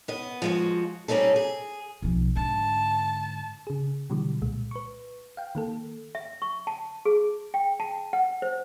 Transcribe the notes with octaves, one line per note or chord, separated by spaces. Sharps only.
B3 D#5
F3 G#3 F#4
G3 C4 C#4 D#4 A4
G#4
B1 F3
G#2 D3 A5
C#3 G#4
B2 D3 E3 F#3 G3
C2 A#2 G#3
B4 C#6
F5 G5
D#3 A#3 A4
E5
C#6
A5
G#4
G5
A5
F#5
C5